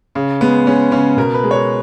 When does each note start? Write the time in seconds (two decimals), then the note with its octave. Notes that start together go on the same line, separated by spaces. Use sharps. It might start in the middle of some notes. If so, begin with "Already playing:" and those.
0.15 C#3
0.41 G#3 B3
0.66 G#3 C#4
0.91 C#3 C#4
1.17 B2 A#4
1.34 B4
1.43 G#3
1.51 C#5